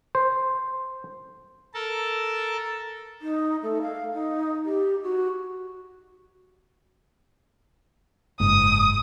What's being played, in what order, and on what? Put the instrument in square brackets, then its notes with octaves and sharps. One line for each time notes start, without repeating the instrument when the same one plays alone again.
[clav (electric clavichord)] C5
[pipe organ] A4 A#4 A5
[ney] D#4
A3
F5
D#4
G4
F#4
[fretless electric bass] F#1 G#2 [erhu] D#6